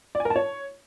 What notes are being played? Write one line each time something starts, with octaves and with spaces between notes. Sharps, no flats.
D5
G#5
A#4
A5
C#5